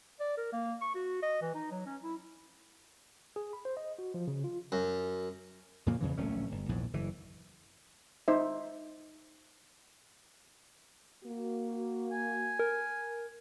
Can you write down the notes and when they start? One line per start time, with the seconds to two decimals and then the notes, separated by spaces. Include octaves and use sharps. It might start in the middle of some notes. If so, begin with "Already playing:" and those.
0.20 D5
0.37 A#4
0.53 A#3
0.81 C#6
0.95 F#4
1.23 D#5
1.42 E3
1.55 D#4
1.71 F#3
1.86 C#4
2.03 E4
3.36 G#4
3.53 B5
3.65 C5
3.77 D#5
3.98 F#4
4.14 F3
4.27 C#3
4.44 F4
4.72 F#2
5.86 F2 A#2 C#3 A#3
6.00 E2 C#3 E3
6.18 D1 A#1 A3 C#4
6.52 G1
6.69 A#1 E2 G#2
6.93 F#1 E3
8.28 D#4 C5 E5
11.24 A#3 F#4
12.12 G#5
12.59 A#4